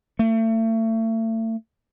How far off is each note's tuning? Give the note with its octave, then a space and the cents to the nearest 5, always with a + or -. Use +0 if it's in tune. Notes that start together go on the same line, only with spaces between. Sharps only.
A3 +35